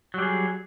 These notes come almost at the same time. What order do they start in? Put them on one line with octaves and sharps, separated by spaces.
F#3 G3 G#4